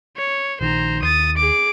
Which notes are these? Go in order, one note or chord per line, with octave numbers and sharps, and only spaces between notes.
C#5
A#1 D#3 C5 A#5
D#2 D#6 A6
G#4 D6